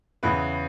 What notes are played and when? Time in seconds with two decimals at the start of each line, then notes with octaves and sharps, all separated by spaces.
0.23 E2 C#3 E3 B4